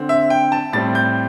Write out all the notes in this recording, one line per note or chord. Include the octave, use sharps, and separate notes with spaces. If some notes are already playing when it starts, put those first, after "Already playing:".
Already playing: D3 C4
E5
G5
A5
A2 G3 C4 A6
G6